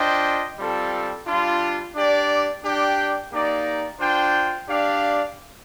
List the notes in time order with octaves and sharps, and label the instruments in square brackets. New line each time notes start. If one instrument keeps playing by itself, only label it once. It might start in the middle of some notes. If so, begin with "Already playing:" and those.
Already playing: [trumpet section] D4 F4 C5 D#5 G5
G3 C4 F4 A4
G3 D4 F4
D4 G4 D5
D4 G4 D5 G5
A#3 D#4 G4 D5
D4 F4 C5 G5
D4 G4 D5 F5